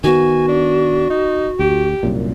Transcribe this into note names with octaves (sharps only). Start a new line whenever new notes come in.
D#3 B3 F#4 G#5
D4
D#4
D2 G4
C2 F#2 A#2